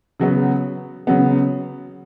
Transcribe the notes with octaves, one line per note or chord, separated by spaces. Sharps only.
C#3 F#3 B3
C#3 F#3 B3